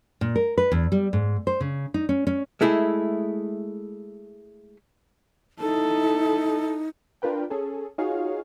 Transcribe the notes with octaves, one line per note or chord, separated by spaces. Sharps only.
A#2
A#4
B4
E2
G3
G#2
C5
C#3
D#4
C#4
C#4
G#3 A3 E4 G#4
D#4 E4 A4
D4 F4 A#4 B4 G5
C#4 G#4 A4
D#4 F4 F#4 G#4 C#5 F5